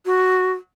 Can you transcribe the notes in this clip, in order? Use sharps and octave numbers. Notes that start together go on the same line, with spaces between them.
F#4